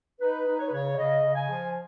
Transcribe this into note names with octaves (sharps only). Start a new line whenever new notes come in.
D#4 B4
D#4
C#5
B4
C#3 C#5
C#3 D#5
C#3
G#5
F3